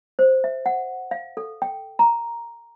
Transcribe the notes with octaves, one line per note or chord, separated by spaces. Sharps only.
C5
E5
F#5
F5
A4
G5
A#5